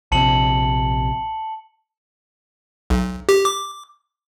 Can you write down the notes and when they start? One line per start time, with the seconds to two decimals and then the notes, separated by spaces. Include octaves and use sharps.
0.12 A#1 C3 A5 C#7 F#7
2.90 B1
3.29 G4
3.45 D6